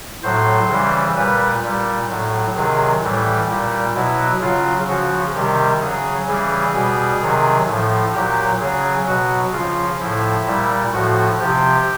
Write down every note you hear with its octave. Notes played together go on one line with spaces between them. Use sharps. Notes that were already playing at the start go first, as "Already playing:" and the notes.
A2 F#3 C5
C#3 E3 G3
A#2 G3 B4
A#2 G3
A2 F#3
C3 D#3 F#3 G#4
A2 E3 G3
A#2 G3
B2 F#3 E4
C#3 F#3 F4
C#3 F3 F#4
C3 D#3 G3 G4
C#3 F#3 G#4
C#3 E3 G3 G#4
B2 G3
C3 D#3 F#3
A2 F3
A#2 F#3 G4
C#3 F#3 G#4
B2 F#3 F#4
C#3 F4
F3
A2 F3 E4
A#2 G3
A2 F3 F#4
C3 F3 G4